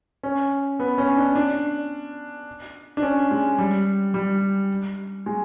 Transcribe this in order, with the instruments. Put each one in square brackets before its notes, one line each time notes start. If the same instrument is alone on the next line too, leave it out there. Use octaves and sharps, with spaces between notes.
[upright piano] C#4
B3
C#4
D4
D4
D4
C#4
G#3
G3
G3
G#3